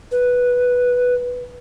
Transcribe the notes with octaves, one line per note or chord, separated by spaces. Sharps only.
B4